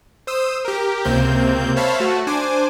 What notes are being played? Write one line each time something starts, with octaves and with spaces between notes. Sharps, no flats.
C5 D#6 E6
G4 A#4
C#2 C3 A#3 C4 G6
C5 C#5 E5 F5 A5 B5
A3 F#4 A4
D4 C5 G#5 D6